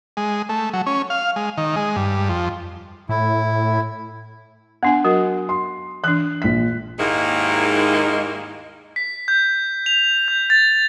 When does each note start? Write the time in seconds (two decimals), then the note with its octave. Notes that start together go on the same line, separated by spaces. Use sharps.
0.17 G#3
0.49 A3
0.73 F#3
0.86 C#4
1.10 F5
1.36 G#3
1.58 D#3
1.76 G#3
1.96 G2
2.29 F2
3.09 A2 E4
4.83 B3 D4 F#5 G#5
5.04 F#3 F#4 A#4
5.49 C6
6.04 E3 D4 F#6
6.42 A#1 B6
7.00 D#2 G#2 D#3 G#3 A#3 E4
8.96 B6
9.28 G6
9.86 F7
10.28 G6
10.50 A6